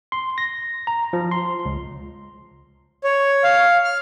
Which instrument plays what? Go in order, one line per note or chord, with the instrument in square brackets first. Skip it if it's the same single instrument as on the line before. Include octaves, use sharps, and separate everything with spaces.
[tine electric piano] C6
A#6
A#5
F3
C6
C#2
[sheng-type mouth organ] C#5
F5
F6